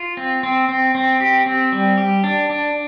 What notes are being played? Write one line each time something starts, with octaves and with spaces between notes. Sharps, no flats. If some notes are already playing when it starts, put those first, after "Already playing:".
Already playing: F4
C4
C4
C4
C4
G4
C4
G3
G4
D4
D4